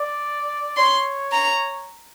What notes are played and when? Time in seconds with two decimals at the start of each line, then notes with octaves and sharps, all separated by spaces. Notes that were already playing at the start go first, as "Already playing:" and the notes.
Already playing: D5
0.77 C#5 C6
1.32 A#5